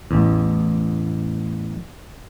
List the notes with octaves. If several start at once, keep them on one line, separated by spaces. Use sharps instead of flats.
A1 E2